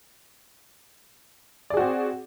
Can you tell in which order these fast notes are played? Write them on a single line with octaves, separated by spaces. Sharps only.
D5 G#4 F#4 C4